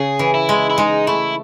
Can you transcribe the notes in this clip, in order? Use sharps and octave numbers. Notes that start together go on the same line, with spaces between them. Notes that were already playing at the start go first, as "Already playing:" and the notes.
Already playing: C#3 G#4
E3
E4
G#3
E4
G#3 D#4
A3 E4